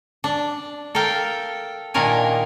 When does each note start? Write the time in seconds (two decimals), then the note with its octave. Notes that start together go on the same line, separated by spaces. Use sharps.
0.24 D4
0.95 A4 A#4 F5 G5
1.94 A#2 D#3 D4 A#4 G#5